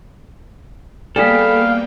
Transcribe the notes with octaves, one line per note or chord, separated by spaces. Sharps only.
G3 A#3 B3 G#4 A4 F5 G5 B5